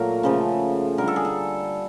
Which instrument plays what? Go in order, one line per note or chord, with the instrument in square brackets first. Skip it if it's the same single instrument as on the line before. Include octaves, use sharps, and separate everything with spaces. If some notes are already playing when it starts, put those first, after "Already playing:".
Already playing: [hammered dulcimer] A#2 F#3 A3 A#4
C#3 F3 A3
D3 G3 A#4
A4
G#4
A4